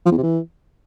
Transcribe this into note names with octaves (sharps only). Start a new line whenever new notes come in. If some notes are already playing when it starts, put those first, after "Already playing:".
F3
E2
C3
E3